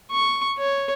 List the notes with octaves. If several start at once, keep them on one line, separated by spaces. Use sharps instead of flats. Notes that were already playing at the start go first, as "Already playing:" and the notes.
C#6
C#5